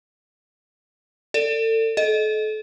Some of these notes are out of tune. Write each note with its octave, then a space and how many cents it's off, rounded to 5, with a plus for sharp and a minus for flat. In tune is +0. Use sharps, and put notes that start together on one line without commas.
A4 +35 D5 +0
A4 -35 D#5 +0